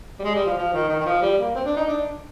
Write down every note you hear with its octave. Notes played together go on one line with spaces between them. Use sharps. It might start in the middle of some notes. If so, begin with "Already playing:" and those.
G3
G#3
G3
F3
F3
D#3
D#3
D#3
F3
G3
A#3
C4
D4
D#4
D4